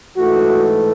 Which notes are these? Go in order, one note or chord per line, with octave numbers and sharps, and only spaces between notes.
G#2 E3 A3 F#4